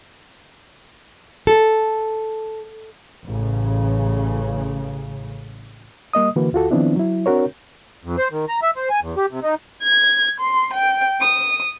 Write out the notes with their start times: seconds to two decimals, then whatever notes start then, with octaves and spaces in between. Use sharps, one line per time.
1.47 A4
3.24 A1 C#3
6.13 G3 A#3 D#5 D#6
6.36 D3 E3 A#3 F#4 B4
6.53 D2 F4 F#4 A4
6.71 D#3 F3 B3 C4 D4 E4
6.96 F#3 E4
7.26 C4 D4 F#4 A#4 C#5
8.05 F2
8.18 C5
8.31 D#3
8.48 A#5
8.63 E5
8.76 C5
8.90 G#5
9.01 E2
9.17 G4
9.31 C3
9.43 D#4
9.83 G#6
10.40 C6
10.74 G5
11.21 D#6